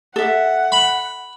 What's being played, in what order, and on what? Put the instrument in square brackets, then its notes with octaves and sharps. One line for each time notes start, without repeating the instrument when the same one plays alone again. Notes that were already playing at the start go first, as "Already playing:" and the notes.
[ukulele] A4 E5 [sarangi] F#5
[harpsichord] B5